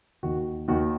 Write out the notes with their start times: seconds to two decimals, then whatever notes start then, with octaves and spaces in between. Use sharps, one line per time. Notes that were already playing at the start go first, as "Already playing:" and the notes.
0.23 D#2 D#3 F#4
0.68 D#2 D#3 F#4